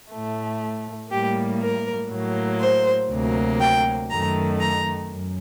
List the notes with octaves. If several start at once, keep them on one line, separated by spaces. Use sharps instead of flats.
A2 A3
A2 G3 A#3 G4
A#4
A2 F#3 A#3
C5
D2 C3 F#3 A#3
G5
F#2 D#3 A3 A#5
A#5
F#2